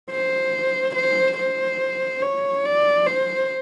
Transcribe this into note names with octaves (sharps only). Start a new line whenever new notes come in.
C5
C5
C5
C#5
D5
C5